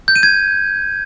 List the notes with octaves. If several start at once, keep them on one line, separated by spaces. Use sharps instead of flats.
G6
D#7
G#6